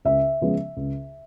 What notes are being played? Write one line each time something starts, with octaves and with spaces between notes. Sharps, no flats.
C#2 E5
C#3 F3 G#3 B3
C#2